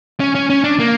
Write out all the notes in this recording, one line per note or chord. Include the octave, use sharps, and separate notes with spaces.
C#4
C#4
C#4
D4
A#3